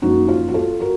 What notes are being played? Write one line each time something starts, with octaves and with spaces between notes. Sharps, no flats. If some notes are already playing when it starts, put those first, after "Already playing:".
F#2 F3 A#3 D#4 F#4
F4
F#4
F4 A4
F#4 A#4